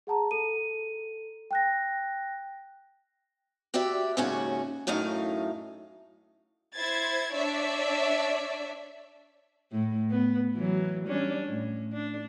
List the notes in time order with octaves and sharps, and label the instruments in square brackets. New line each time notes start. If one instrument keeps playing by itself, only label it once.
[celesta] G#4 F#5 A5 A#5
A4 D#7
G5 F#6 A#6
[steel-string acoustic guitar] F#4 G4 B4 D5 E5
D#2 G#2 C#3 C#4 F#4 G#5
F#2 A2 A3 D#4 F5
[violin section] E4 C5 G#6 A6
D4 C#5 D5 E5
[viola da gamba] A2
B3
E3 F#3
G3 C#4 D4
A2
D4